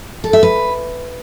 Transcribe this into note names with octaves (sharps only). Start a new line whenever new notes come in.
A4
E5
B4